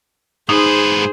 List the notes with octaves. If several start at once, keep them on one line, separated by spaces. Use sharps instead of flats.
G#2 D#4 G#4 B4 C5